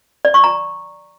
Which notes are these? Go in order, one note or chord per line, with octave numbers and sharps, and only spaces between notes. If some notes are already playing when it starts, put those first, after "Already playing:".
D5
C#6
A#5